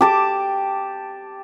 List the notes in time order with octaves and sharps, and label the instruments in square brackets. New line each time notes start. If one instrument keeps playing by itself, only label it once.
[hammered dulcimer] G4 A5 D6